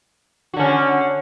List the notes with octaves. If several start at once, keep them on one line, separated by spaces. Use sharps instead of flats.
D3 C#4 F#4